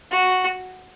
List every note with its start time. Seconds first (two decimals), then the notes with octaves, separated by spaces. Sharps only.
0.12 F#4